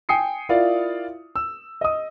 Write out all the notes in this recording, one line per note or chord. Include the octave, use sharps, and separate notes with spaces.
G5 G#5 D#6 C7 C#7
E4 F4 A#4 D5 E5 F5
E6
D#5 D#6